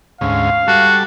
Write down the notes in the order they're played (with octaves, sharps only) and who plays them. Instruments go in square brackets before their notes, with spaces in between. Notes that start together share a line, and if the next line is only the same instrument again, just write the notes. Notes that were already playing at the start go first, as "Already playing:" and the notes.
[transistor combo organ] D2 G#2 C#4 [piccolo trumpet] F5
[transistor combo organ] G3 A4 A5 [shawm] F#4